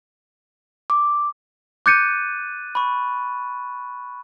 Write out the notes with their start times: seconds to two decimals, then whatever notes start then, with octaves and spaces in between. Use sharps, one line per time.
0.90 D6
1.86 D6 F#6 G6 A6 C#7 D#7
2.75 B5 C#6